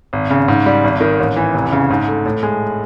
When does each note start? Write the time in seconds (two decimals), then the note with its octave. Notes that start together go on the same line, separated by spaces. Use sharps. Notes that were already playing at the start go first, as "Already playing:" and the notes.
0.13 G#1
0.30 C#3
0.48 G#2
0.66 G3
0.84 G#1
1.01 D#3
1.19 A1
1.36 E3
1.54 F1
1.72 C#3
1.90 G#2
2.07 A3
2.25 A2
2.43 G#3